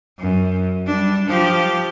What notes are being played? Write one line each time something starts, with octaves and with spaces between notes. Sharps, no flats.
F#2
G3 D4
F3 G4